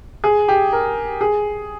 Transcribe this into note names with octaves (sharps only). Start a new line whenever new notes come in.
G#4
G4
A#4
G#4